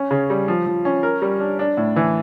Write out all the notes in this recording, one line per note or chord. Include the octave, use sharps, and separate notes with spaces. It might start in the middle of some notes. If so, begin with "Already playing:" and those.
Already playing: C#4
C#3
G3
F3
F3
C#4
A#4
G3
D4
D4
A2
E3